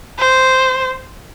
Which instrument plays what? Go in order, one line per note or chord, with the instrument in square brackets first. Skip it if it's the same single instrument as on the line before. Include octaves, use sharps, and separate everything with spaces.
[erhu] C5